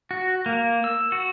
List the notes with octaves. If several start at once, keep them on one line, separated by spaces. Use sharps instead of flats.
F#4
A#3
E6
F#4